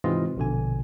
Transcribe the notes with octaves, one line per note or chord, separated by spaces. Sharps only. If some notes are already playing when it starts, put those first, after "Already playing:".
G#2 C3 E3 C4 F4 D#5
A#1 B2 D3 G#5